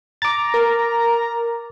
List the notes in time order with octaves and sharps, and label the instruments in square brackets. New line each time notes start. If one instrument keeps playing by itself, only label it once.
[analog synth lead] A#5 [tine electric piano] D6 A6
[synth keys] A#4